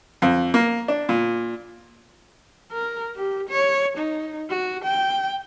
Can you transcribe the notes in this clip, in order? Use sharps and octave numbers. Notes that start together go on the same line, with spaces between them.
F2
A#3
D4
A#2
A#4
G4
C#5
D#4
F#4
G5